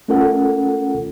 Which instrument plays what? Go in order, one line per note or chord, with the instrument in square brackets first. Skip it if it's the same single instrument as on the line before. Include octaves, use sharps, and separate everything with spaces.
[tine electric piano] A3 C#4 F4 A4 A#4 F#5